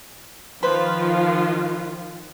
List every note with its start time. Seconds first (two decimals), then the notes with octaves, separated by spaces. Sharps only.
0.63 D#3 F3 F4 B4 C5 B5